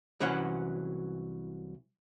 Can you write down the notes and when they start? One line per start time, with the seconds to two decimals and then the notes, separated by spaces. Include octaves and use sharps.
0.20 C2 E3 F#3 C#4 F#4 F#5